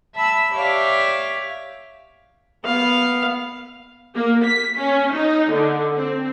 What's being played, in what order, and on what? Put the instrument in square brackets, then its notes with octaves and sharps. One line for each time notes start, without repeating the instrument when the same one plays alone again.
[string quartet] E5 A5 B5 E6
G4 C#5 D5 E5 F5
[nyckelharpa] B3 F5
[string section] A#3
B6
C#4
D#4
D3
C4